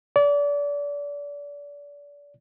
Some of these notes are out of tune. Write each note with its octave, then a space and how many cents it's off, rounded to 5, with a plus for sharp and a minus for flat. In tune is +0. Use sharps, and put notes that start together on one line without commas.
D5 -30